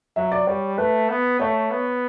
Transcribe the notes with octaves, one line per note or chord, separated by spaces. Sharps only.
F#3 E5
D5
G3 C#5
A3 B4
B3
A3 C#5
B3